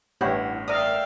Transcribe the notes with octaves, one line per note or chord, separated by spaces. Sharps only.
A1 G2 B3 E4 G4 C#5 F#5
A#4 D5 E5 F5 G5 D#6